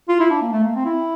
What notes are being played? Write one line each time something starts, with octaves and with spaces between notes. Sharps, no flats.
F4
E4
D4
A#3
A3
A#3
C4
E4